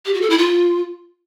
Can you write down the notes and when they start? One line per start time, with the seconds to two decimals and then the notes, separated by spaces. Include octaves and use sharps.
0.05 G4
0.14 F#4
0.22 A4
0.30 E4
0.38 F4